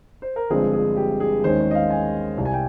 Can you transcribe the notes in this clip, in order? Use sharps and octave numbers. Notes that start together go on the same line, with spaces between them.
C5
A#4
G1 G2 F3 G#3 C4 G#4
G#4
G4
G#4
D#2 D#3 G#3 C#4 C5
C#5
D#5
F5
G#5
C2 C3 G3
G#5
G5